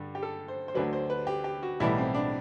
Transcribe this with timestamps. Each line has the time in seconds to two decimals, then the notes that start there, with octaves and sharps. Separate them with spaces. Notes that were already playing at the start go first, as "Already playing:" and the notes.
Already playing: G2 D3 G3
0.15 G4
0.23 A4
0.48 C5
0.68 C5
0.74 D2 D3 F#3 B4
0.93 C5
1.10 B4
1.27 G4
1.44 G4
1.63 F#4
1.80 B1 A2 E3 G3 E4
1.98 C4
2.14 D4